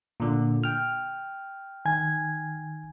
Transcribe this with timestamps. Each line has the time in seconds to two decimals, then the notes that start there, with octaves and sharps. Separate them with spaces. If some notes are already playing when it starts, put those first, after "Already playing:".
0.20 A#2 D3
0.64 G5 F6
1.85 D#3 G#5 G#6